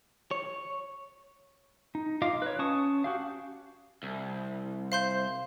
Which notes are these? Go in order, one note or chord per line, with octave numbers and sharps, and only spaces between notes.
C#5
D#4
F4 D#5 F5 D6
B4 C#5
C#4 A5 C#6 D#6
F#4 G4 F5
C2
C5 F5 C6 G6